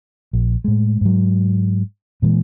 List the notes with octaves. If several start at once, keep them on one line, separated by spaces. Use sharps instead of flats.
A#1
A2 G#3
G#2 F#3
A#2 E3 G3 G#3